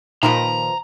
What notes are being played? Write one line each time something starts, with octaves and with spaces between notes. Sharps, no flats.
A#2 D#3 F3 A#4 B4 A#5